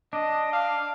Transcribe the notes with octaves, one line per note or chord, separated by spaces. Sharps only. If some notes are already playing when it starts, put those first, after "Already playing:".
D4 D#5
F5